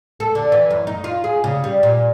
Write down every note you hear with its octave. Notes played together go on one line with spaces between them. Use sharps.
A4
D3
E3
F#2
D#4
F4
G#4
C#3
G3
A#2